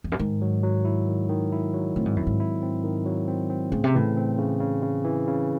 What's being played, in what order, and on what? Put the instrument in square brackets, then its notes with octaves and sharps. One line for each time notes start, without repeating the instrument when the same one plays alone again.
[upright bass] E2
F#2
[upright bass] G#2 [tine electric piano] D#3
[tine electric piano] F#3
F#3
E4
D#3
D#3
E4
F#3
[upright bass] A2 [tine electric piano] C4
[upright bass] G#2
[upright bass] F#2 [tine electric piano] E4
[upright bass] G#2
[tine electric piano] E4
C4
D#3
F#3
C4
C4
[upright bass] A2 [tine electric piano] C#3
[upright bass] C3
[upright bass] A2 [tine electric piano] E3
[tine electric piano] C4
C#3
C#3
C#3
E3
C#3